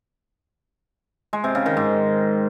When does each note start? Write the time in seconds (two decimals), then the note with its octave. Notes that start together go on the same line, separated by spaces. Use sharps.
1.33 G#3
1.44 C3
1.55 C#3
1.66 D#3
1.77 G#2